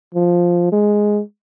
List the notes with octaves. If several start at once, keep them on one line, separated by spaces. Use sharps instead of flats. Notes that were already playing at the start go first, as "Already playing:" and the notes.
F3
G#3